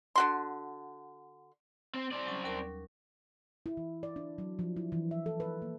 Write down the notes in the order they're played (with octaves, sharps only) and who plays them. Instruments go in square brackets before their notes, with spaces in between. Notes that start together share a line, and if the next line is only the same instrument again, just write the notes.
[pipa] D3 F#4 C6
[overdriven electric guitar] C4
C4 D5
[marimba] F#3 G3 C#4
D#2 A#4 D6
[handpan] E4
E3
D5
D4
F#3
F3
E4
E3
E5
A4
B4
A#3